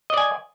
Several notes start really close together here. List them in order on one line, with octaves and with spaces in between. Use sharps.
D#5 D5 G#5